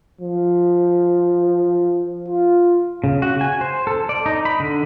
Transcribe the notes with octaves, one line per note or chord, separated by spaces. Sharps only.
F3
F4
C#3
F#4
G#5
C5
A4
D5
D#4
B5
D3